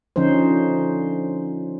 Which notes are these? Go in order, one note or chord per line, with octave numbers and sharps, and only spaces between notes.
D3 F3 C#4 D#4 C5